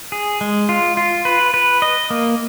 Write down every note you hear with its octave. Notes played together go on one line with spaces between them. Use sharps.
G#4
G#3
F4
F4
B4
B4
D#5
A#3